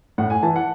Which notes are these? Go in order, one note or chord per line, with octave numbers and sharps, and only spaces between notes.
A2 F#5
G#5
E3 A5
F#5